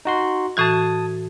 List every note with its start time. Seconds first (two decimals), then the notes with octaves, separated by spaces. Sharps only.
0.05 D#4 F#4 C6
0.57 A2 E3 F#4 A5 D#6 G#6